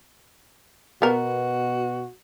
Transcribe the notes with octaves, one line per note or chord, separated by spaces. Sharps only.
B2 B3 F#4 A#4